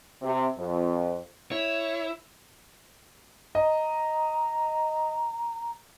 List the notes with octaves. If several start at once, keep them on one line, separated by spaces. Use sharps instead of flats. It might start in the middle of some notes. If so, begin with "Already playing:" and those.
C3
F2
E4 C#5
D#5 A#5